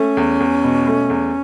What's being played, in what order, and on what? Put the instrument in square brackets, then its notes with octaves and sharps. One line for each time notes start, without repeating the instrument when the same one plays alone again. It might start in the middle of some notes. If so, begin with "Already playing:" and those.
Already playing: [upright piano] A3 [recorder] C#4
[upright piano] E2
E2
B2
A3
E2